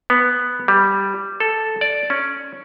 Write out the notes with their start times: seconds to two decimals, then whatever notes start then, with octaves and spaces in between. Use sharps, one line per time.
0.10 B3
0.68 G3
1.40 A4
1.81 D5
2.10 C#4